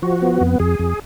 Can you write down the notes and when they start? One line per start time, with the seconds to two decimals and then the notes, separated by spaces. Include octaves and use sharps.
0.02 F3 F#4
0.22 B3
0.41 F2
0.60 F2 G#4
0.79 F2